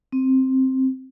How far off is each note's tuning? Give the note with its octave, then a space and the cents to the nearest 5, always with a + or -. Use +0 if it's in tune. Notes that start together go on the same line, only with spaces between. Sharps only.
C4 +5